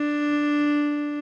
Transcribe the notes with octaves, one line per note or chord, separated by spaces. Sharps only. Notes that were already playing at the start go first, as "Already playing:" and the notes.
Already playing: D4